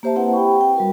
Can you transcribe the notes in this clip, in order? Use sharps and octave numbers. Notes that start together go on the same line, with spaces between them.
A#3 G4 C5 E5 A5
A#3 C4 E4 B4 F#5
G4 G5 B5 C#6
G5
G5
G3 F#4 A#4